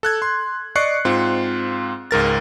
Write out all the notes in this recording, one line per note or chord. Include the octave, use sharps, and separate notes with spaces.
A4 F#6 G#6
C6
D5 D#5 C#6 F#6 C7 C#7
G#2 C4 F4
C#2 G#2 A#4 A6